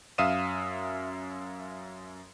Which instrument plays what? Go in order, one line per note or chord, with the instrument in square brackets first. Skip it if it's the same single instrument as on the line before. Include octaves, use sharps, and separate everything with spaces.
[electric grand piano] F#2 E5 F5 D#6 D#7 E7